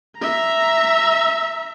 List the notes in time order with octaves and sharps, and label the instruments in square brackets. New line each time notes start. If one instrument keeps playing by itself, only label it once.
[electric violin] E5 A#5